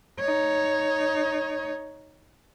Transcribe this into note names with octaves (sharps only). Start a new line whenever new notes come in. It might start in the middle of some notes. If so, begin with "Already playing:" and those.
D#4 C#5